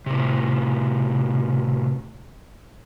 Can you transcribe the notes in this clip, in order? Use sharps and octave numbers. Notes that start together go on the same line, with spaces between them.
A2 C3